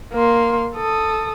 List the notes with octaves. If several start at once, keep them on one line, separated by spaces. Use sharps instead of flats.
A#3 C6
A4 D#6